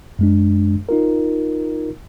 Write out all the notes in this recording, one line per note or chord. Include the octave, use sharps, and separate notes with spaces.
F#2 G#3 D4
D#4 F4 A#4